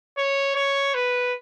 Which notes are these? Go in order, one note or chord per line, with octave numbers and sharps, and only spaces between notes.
C#5
C#5
B4